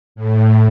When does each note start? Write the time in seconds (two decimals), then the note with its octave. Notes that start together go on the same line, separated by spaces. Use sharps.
0.16 A2